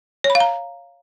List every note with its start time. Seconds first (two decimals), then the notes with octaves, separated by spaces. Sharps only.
0.24 C#5
0.30 B5
0.35 F5
0.40 A#5